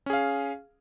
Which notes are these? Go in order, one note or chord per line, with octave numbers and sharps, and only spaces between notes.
C#4 G#4 F5